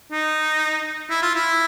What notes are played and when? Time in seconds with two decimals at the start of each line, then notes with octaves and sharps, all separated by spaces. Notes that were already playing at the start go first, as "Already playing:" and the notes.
0.12 D#4
1.10 E4
1.22 F4
1.35 E4